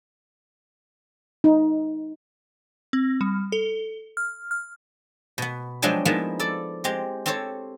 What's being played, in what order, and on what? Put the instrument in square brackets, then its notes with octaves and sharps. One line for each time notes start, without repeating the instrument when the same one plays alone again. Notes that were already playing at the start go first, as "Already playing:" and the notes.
[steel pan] D#4
[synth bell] C4
G3
A4
F6
F6
[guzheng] B2 B3
F3 F#3 G#3 D4 G5 G#5
F3 G#3 A#3 B3 D#4 E4
A4 D5
G#3 C4 G4
C4 G4 A4 C5 C#5